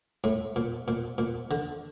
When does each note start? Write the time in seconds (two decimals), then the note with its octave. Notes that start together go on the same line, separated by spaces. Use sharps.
0.24 A2
0.56 A#2
0.88 A#2
1.18 A#2
1.51 D3